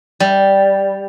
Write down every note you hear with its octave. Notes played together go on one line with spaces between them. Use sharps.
G3